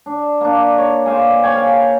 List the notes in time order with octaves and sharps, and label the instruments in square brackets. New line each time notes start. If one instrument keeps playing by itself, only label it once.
[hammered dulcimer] D4
A#3 D4
C#5
C5 D5 F5 G#5
C#5 G5 G#5
F5